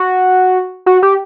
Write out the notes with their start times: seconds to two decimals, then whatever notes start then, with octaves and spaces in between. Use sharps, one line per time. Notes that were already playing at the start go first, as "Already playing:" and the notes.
Already playing: F#4
0.86 F#4
1.02 G4